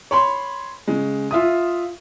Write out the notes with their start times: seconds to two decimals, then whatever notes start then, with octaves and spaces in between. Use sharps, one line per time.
0.11 C#5 B5 C6
0.87 C#3 G#3
1.31 F4 E5 D#6